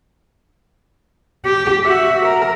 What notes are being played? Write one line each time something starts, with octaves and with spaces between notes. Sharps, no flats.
G4
F#4 E5
A#4